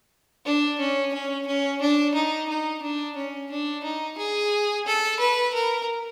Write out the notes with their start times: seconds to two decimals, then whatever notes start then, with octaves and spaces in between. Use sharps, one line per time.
0.45 D4
0.79 C#4
1.14 C#4
1.47 C#4
1.81 D4
2.15 D#4
2.49 D#4
2.82 D4
3.16 C#4
3.51 D4
3.84 D#4
4.18 G#4
4.86 A4
5.19 B4
5.54 A#4